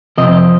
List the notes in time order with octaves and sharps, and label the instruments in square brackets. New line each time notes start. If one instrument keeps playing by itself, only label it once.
[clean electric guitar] F2 C3 F3 C4 D#5